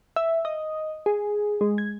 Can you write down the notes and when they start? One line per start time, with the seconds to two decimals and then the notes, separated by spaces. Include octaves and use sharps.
0.16 E5
0.45 D#5
1.06 G#4
1.61 G#3
1.78 G#6